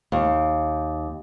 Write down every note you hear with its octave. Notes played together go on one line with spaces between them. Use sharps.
D#2